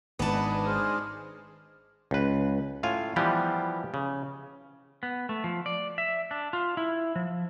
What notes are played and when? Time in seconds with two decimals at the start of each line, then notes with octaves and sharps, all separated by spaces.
0.19 G#1 G#3 B3 D4 D#4 B4 A5
0.65 G#4 C5 F6
2.11 C#2 B4
2.83 A2 F4 F5 G#5
3.16 E3 F3 G3 B3 G4
3.94 C#3
5.03 B3
5.29 A3
5.44 F3
5.66 D5
5.98 E5
6.31 D4
6.53 F4
6.77 E4
7.15 F3